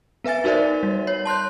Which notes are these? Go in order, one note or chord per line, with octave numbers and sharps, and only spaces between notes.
B3 B4 E5 G#5 A6
D#4 F#4 A#4 C5 D5 E5
G3
C#5
A5 C6 F#6 G6